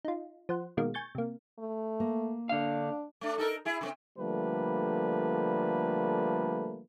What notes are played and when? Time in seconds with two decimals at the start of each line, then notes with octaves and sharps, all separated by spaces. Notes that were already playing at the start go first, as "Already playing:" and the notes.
0.05 D#4 F4
0.49 F3 C5 F#5
0.77 B2 D#3 G#3 A#3
0.94 G#5 C#6 G6 A6
1.15 C3 A#3
1.58 A3
2.00 A#3
2.49 D3 D4 F5
3.21 A3 D4
3.38 D#4 A4 A#4
3.65 E4 G#4
3.81 C#3 A3 C4
4.18 D3 F3 G3 A3 A#3 B4